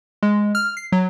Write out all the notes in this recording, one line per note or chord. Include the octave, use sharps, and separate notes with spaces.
G#3
F6
C7
F#3